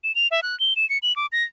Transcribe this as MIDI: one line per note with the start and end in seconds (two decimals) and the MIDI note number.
0.04 0.15 100
0.15 0.28 101
0.31 0.41 76
0.43 0.58 90
0.60 0.74 103
0.76 0.88 100
0.90 0.98 97
1.03 1.15 102
1.16 1.26 86
1.32 1.44 94